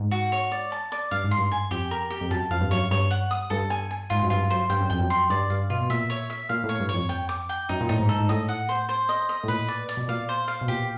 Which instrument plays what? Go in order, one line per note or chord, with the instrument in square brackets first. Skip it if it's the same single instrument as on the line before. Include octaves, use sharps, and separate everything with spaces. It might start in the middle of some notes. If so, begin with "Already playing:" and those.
Already playing: [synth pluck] G#2
[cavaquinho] F#4
C#5
D5
A5
D5
[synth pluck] G2 [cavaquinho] F5
[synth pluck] G#2
[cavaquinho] C6
[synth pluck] G2
[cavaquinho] G#5
[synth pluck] F2 [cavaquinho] G4
[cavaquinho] A#4
G4
[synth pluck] F2
[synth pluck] F#2 [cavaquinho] A5
[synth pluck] F2 [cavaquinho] F5
[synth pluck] G2
[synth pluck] F#2 [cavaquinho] C#5
[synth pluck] G2 [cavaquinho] C#5
[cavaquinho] F#5
D#6
[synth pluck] G2 [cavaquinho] A4
[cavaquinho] G#5
G#5
[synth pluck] G#2 [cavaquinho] F4
[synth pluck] F#2
[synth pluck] G2 [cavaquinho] F4
[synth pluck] F#2 [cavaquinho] C5
[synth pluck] G2 [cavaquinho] G5
[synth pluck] F#2
[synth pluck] F2 [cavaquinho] G5
[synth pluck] F#2
[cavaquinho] C6
[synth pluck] G2 [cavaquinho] D5
[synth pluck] G2 [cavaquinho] F5
[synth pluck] B2 [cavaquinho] F4
[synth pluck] B2
[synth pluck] A#2 [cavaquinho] E5
[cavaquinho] C#5
E5
[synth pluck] A#2 [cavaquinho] F5
[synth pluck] A2
[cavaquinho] C#5
[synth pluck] G2
[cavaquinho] C#5
[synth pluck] F2
[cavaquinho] G5
D6
G5
[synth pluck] F#2 [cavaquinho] D#4
[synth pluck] A#2
[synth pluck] A2 [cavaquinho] D#4
[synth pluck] G#2
[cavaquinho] A4
[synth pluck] G#2
[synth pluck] A2 [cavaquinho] D#5
[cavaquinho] F#5
C5
C5
D#5
D#5
[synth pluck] A2
[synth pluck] A#2 [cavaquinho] B4
[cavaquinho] D5
D5
[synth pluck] B2
[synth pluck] A#2 [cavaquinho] F5
[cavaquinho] C5
F5
[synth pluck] B2
[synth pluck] A#2 [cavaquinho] G4